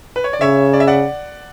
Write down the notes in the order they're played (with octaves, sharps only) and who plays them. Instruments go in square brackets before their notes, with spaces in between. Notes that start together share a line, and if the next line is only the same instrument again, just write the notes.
[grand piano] B4
C#5
D5
[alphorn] C#3 [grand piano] C#5 E5
[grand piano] D5
E5
D5 F#5